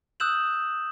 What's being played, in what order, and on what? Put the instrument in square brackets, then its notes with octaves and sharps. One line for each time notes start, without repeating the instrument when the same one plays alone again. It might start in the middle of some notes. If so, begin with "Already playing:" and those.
[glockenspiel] D#6 E6 F#6 G6 E7 F#7